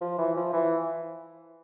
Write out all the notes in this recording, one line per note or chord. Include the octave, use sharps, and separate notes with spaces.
F3
E3
F3
E3